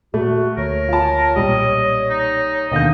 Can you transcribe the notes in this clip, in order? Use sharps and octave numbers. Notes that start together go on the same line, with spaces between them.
A#2 A3 F#4
D2 A#4 C#5
F4 A5
B1 A#2 G3 D#5
D#4
D#2 B2 D3 D#5 F5 G6